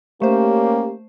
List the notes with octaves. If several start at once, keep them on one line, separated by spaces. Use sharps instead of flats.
A3 A#3 C#4 G4 C5